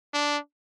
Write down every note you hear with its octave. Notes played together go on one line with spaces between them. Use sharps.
D4